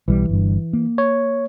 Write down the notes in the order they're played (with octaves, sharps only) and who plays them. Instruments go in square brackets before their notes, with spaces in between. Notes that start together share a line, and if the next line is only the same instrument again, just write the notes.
[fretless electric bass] B1 G3 [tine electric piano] E3
[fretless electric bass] G1 G2
A#3
[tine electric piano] C#5